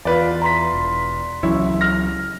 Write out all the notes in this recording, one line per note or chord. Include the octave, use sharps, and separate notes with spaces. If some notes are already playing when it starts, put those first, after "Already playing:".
E2 F4 B4 D5
A#5 C6 B6
E1
C#2 E3 F#3 C#4 E4
F6 A#6